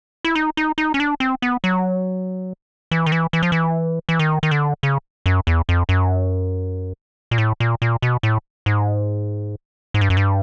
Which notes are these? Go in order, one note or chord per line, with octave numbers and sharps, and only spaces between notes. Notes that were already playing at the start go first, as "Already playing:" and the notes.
E4
D#4
D#4
D#4
C#4
D4
C4
B3
F#3
E3
D#3
E3
E3
F3
E3
E3
D#3
D#3
D3
C#3
F#2
E2
F2
F#2
A#2
A2
A#2
A#2
B2
A2
G#2
G#2
G2
F#2
G2